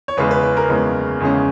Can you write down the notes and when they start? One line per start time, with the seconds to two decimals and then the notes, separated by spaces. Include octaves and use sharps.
0.08 C#5
0.17 E2 C#3 G#3 C#4 B4
0.31 B4
0.43 B4
0.57 A#4
0.70 E2 C#3 G#3 C#4
1.20 E2 C#3 G#3 C#4